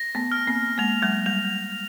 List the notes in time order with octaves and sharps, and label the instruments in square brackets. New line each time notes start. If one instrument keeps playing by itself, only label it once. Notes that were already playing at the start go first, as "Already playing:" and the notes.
Already playing: [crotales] A#6
[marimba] A3 B3
[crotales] F6
[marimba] A#3 C4
[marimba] G#3 A#3 [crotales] F7
[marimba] F#3 G#3
[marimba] G3 [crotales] F7